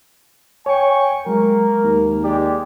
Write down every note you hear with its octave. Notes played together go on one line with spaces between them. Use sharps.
C#5 G5 G#5 C#6
F#3 G#3 A#3 A#4
D#2
G#3 G4 D5